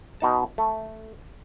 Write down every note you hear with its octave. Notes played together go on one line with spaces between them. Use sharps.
B2 D#4 A5
A3